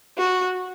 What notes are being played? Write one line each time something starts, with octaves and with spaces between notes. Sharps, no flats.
F#4